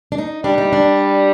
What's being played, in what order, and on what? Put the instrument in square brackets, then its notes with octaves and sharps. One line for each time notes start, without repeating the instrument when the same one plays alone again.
[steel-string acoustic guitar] D4
D#4
[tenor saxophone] G3 [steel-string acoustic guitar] D4
[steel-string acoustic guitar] D#4
D4